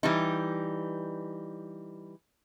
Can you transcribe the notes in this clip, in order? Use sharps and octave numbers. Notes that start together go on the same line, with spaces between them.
E3 G3 D#4